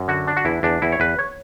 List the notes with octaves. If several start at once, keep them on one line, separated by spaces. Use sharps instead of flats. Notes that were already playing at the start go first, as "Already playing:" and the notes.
Already playing: F#2
D3 F#4
D4
F#4
E2 E4
E2 D4
E2 E4
C#5
E2 B4
C#5